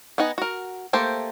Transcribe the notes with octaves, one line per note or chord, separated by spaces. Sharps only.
B3 D#4 F#5 G#5
F#4 A#4
A3 A#3 G4 A4 C5